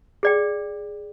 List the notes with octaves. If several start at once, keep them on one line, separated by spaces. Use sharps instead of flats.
G#4 D5 G5